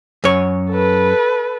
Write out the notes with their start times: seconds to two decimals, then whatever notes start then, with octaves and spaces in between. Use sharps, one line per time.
0.24 F#2 C#5
0.70 A4 B4